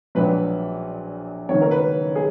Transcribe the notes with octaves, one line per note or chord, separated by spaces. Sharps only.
A#1 A#2 F#3 B4
F#1 F#2 D#3 F#3 C#5
A#4
B4
G#4